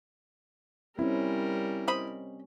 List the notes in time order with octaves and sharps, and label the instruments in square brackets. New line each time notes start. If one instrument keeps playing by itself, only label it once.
[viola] G3 A#4 [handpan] C4 C#4 [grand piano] E4
[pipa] C5 D#5 B5